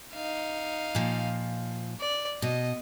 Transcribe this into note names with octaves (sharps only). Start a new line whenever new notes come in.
D#4 F5
A#2 F3
D5
B2 D#5